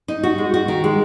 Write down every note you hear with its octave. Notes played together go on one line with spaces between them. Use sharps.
D#4
F#4
G#3
F#4
D#3
G#3